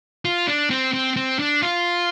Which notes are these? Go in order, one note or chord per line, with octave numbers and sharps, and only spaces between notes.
F4
D4
C4
C4
C4
D4
F4